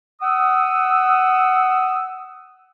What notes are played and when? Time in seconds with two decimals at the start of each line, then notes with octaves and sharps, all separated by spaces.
0.21 F#5 D#6 E6